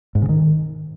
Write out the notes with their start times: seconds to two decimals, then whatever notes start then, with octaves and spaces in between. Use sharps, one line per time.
0.15 G#2
0.22 C#3
0.29 D#3